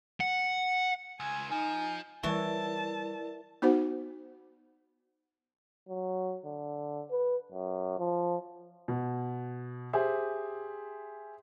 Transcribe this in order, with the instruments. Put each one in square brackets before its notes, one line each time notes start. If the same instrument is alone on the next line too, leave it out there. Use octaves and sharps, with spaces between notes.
[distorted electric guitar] F#5
[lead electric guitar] C#2 [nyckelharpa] G#5
[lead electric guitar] F3 [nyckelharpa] D#4 [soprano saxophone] G#5
[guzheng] E3 C#5 [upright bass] G3 [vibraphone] E4 A#4 D5 [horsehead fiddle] A5
[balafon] B3 D#4 F#4 C5 F#5
[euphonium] F#3
D3
B4
F#2
F3
[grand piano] B2
G4 G#4 C5 E5